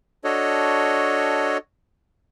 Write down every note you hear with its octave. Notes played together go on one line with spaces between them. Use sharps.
D4 F#4 A4 C#5 D#5